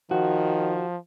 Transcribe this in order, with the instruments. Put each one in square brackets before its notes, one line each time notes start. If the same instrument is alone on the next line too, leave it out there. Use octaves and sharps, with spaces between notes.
[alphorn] D#3 [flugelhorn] F3 [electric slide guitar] F#4